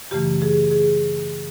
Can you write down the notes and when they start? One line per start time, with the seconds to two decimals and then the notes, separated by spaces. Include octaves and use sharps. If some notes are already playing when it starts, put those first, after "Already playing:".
0.11 F#2 C#3 E3 A3 G4
0.42 G#4
0.71 G#4